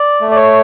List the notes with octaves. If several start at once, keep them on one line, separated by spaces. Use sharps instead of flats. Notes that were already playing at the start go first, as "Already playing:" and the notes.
Already playing: D5
A3
D5
C#5